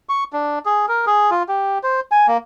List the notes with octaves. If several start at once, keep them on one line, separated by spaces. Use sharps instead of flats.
C#6
D4
G#4
A#4
G#4
F4
G4
C5
G#5
A#3